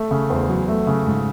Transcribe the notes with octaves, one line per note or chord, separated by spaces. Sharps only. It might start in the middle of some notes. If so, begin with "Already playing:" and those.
Already playing: A3
C#3
E2 C5
F#3
A3
C#3
G#2